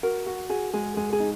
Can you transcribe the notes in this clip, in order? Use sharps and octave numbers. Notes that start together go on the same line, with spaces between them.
F#4 A#4
F#4
F#4 G#4
G#3 G#4
G#3 G#4
G#4
D#4